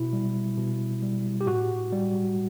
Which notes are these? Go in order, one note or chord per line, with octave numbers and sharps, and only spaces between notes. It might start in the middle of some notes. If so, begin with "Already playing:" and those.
Already playing: B2 E4
G3
B2
G3
G4
A2 F#4
G3